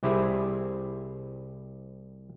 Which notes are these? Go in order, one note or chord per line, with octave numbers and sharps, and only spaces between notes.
C2 C4 E4 G4 G#4